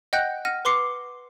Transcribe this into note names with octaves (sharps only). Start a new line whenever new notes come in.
D#5 F#5 G5 F#6 G6 A#6
F#5 F6 A#6 D#7
B4 C6 D6 C7 C#7